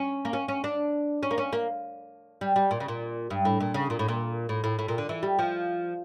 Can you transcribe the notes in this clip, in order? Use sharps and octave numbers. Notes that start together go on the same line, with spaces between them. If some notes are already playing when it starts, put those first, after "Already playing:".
Already playing: C#4
A#3
C#4
C#4
D4
C#4
A#3
C#4
A#3
G3
G3
A#2
C#3
A#2
G2
A2
A#2
C#3
A#2
A2
A#2
A2
A2
A2
A#2
D3
E3
G3
F3